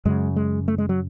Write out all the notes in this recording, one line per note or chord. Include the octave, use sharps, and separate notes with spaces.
F#2 C#3 G#3
G#3
A3
G#3
F#3